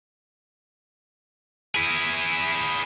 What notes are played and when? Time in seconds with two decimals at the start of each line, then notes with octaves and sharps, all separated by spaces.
1.75 E4 G#4